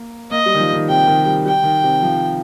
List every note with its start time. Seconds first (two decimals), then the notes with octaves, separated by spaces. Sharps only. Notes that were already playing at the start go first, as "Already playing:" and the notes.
Already playing: A#3
0.31 A#3 D#5
0.46 G3
0.55 D#3
0.59 F3
0.74 D#3
0.88 C3 G5
1.07 D#3
1.26 G3
1.45 G3 G5
1.64 D#3
1.83 C3
2.02 F3